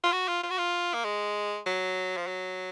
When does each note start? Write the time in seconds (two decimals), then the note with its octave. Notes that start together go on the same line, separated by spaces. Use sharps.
0.04 F4
0.12 F#4
0.28 F4
0.43 F4
0.50 F#4
0.58 F4
0.94 A#3
1.04 G#3
1.66 F#3
2.17 F3
2.27 F#3